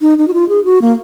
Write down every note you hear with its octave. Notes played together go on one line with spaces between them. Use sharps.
D#4
D#4
F#4
F4
G#4
F#4
A#3